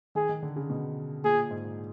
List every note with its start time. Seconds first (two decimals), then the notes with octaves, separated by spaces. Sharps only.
0.15 D#3 G#4
0.29 D#3
0.42 D3
0.56 C#3
0.70 B2
1.24 A#2 G#4
1.51 G#2